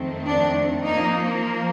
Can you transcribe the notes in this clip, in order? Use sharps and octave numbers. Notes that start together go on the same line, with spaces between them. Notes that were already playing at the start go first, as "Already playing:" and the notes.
Already playing: F2 D#3 A3 C4
D4
F3 A#3 D#4